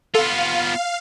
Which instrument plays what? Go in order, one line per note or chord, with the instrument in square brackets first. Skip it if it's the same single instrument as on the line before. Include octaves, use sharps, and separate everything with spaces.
[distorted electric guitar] B3 F4 [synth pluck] A4 [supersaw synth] F5